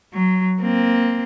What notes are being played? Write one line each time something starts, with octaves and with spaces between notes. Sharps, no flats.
F#3
A#3 C4